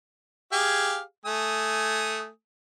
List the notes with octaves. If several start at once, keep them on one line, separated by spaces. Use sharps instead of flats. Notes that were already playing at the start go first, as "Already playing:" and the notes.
G4 G#4 F5
A3 G#5 D#6